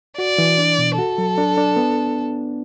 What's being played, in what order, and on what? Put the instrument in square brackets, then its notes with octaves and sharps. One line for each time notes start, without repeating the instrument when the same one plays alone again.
[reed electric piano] F#4 [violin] D5
[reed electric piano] E3
D4
B2
[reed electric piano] F#4 [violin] A4
[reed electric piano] F#3
D4
D4
B3